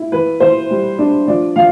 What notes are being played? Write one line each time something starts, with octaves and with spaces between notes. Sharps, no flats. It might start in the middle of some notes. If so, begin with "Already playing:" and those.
Already playing: E4
E3 B4
E3 C5
G3
D4
F3 D5
F3 F5